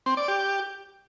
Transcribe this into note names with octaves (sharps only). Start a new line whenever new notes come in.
C4
D5
G4